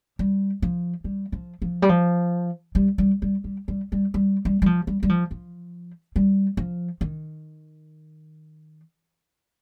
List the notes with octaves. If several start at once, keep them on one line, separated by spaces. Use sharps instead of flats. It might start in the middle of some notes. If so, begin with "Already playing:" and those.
G3
F3
G3
F3
F3
G3
F3
G3
G3
G3
G3
G3
G3
G3
G3
G3
F3
G3
G3
F3
F3
G3
F3
D#3